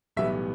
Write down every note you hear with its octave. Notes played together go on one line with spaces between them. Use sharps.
B1 A2 E3 G3 B3 E5